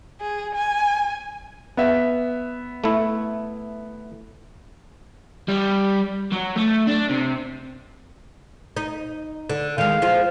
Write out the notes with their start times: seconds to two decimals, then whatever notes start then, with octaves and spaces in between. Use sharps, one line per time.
0.20 G#4
0.55 G#5
1.77 B3 E5
2.84 A3 E4
5.48 G3
6.32 F#3
6.56 A3
6.87 D4
7.10 C3
8.77 D#4
9.49 D3
9.78 D#3 G#3 F5
10.02 F3 G#3 F4